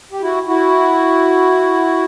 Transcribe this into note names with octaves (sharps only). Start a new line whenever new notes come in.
G4
E4 F#4
E4 F#4